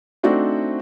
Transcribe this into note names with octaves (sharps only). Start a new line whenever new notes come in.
A3 C4 D4 D#4 F#4 C5